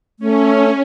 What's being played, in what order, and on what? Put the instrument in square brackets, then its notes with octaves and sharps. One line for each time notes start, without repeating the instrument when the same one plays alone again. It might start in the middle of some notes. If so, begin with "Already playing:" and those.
[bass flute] A3 [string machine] C#4